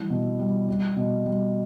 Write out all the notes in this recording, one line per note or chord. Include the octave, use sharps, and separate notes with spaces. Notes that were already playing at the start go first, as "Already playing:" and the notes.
Already playing: E3 G3 E4
B2
G3
G3
B2
G3